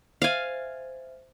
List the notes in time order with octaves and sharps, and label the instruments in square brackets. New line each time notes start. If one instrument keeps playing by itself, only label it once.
[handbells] C5 E5 [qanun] F5 G#5